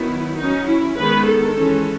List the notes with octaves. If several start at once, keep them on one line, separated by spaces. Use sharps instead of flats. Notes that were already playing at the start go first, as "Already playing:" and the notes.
Already playing: D#3 F#3 B3 E4
F#3 C#4 D#4
E4
D#3 G#3 B3 B4
A4
E3 G#3 C#4